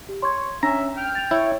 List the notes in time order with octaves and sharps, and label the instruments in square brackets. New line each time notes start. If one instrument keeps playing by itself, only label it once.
[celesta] G4
[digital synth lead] C#5 [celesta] C6 C#6 G#6
[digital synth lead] C#4 [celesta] D4 [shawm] E5 [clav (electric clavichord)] A#5
[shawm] G5 [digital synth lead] F6
[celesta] A6 F7
[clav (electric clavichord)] E4 [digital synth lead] C#5